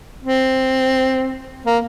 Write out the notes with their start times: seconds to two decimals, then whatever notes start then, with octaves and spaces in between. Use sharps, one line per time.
0.23 C4
1.66 A#3